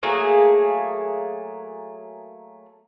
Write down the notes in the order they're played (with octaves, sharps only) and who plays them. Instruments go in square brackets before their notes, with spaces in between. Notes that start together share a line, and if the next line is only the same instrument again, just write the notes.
[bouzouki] F#3 A3 A#3 G#4